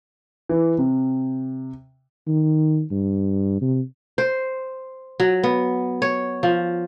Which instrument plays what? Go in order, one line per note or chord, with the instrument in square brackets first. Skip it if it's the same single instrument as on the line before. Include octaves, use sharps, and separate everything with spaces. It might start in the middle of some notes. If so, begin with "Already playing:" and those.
[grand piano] E3
C3
[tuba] D#3
G2
C3
[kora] C5
F#3
B3
C#5
F3